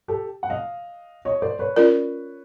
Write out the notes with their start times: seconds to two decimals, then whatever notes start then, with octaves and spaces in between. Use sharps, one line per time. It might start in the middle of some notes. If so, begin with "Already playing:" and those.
0.08 G4 A4
0.43 F#5
0.50 D#5 F5
1.25 C#5 D#5
1.42 C5 D5
1.59 B4 C#5
1.76 C#4 F4 A#4 D5